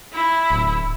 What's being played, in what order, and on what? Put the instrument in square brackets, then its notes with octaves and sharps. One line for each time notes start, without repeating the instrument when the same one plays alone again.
[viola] E4
[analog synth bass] D1